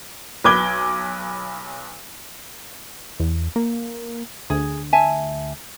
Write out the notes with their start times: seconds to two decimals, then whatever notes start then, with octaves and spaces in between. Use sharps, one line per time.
0.44 B1 B4 D6 G#6 G7
3.20 E2
3.56 A#3
4.50 D2 G#4
4.93 E5 G#5 A5